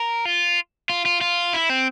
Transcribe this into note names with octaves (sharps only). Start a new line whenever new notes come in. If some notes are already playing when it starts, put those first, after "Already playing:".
Already playing: A#4
F4
F4
F4
F4
E4
C4